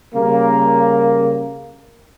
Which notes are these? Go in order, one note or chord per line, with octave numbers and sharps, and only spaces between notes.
C#3 G3 A#3